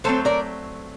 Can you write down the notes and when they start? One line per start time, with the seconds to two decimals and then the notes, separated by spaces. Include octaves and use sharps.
0.04 F#3 A3 C4 A4 C5
0.25 A#4 D5